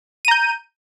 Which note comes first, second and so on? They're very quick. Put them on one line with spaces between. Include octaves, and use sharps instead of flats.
D#7 A#5 G6